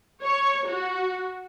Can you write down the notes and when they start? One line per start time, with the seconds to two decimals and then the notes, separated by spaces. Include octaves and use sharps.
0.22 C#5
0.67 F#4